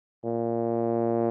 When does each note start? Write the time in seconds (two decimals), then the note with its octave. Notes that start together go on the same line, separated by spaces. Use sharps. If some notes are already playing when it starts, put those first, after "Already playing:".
0.24 A#2